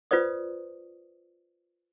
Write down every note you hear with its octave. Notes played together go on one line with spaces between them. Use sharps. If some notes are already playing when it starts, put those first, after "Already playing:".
F4 B4 C5 D5 D#6